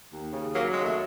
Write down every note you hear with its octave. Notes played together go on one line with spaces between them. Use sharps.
D#2
C#3
F#3 A#3
D#2 G#3
A3